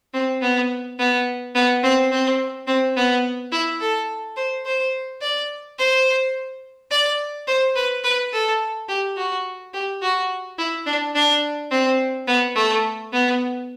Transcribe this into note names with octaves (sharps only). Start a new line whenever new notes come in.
C4
B3
B3
B3
C4
C4
C4
B3
E4
A4
C5
C5
D5
C5
D5
C5
B4
B4
A4
G4
F#4
G4
F#4
E4
D4
D4
C4
B3
A3
B3